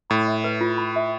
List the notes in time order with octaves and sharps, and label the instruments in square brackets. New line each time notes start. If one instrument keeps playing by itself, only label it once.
[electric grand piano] A2 [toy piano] B5
[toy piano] E5
B4
F4
B5
E5